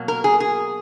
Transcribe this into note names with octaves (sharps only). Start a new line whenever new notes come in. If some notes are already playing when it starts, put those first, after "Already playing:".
Already playing: B2 F#3 A#3
A#4
G#4
G#4